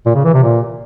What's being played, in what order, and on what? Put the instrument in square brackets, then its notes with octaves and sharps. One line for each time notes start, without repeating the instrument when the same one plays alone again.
[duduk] A#2
C#3
E3
C3
A#2